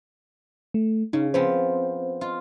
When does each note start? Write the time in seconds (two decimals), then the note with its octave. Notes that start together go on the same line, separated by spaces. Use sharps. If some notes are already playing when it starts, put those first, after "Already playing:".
0.74 A3
1.13 C#3 D#4
1.34 F3 B3 C4 C5
2.21 F4